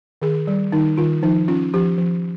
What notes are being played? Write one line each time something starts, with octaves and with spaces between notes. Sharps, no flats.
D#3 G#4
G3
D#3 D#4
D#3 F4
F3 D#4
C#4 F4
F3 G4
F3